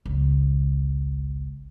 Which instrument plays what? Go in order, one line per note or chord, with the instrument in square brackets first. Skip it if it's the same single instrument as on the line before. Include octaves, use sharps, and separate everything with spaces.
[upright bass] G#1 C#2